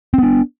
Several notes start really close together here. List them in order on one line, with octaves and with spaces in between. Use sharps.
C4 B3 D4